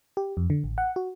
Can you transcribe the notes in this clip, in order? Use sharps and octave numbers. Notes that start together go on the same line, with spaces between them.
G4
F2
D3
A1
F#5
F#4